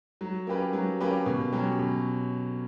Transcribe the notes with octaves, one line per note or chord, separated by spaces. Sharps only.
F#3
A#3 C#4 G4 B4
F#3
A#3 C#4 G4 B4
B2
F#3 C#4 G4
B2